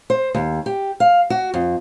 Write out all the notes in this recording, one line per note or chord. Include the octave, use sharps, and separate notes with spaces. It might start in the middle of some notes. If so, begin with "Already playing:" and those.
C5
D#2
G4
F5
F#4
F2